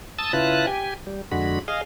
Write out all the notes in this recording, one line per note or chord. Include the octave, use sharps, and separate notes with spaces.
A5 D#6 E6 A6
C#3 E4 F4 B4 A5 F#6
G4 G#5
G3
F2 D3 G#3 F#4 B5
G#4 D#5 F5